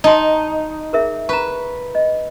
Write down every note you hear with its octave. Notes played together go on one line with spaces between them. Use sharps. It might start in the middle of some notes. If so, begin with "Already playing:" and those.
D#4 D#5 A5 C6
G#4 A#4 E5
B4 A#5 C#6
D#5